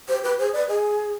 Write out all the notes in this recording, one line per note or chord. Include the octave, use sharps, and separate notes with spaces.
G4 C5
G4 B4
G#4 C5
B4 D5
G#4 D#5